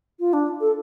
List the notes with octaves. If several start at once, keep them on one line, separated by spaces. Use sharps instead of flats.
F4
D4
A4